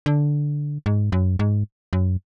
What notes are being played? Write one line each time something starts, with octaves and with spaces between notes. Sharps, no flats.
D3
G#2
F#2
G#2
F#2